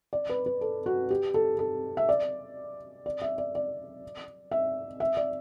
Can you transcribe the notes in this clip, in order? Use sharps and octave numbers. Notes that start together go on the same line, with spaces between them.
D5
B4
B4
A4
F#4
G4
A4
A4
E5
D5
D5
E5
D5
D5
E5
E5
D5